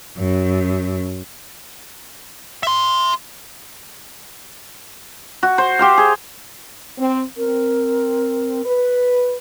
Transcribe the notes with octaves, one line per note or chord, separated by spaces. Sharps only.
F#2
E5 C6
F#4
C5
G4 C5 F5
G#4
C4
C4 A#4
B4